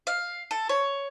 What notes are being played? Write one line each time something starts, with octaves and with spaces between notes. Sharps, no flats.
F5
A4
C#5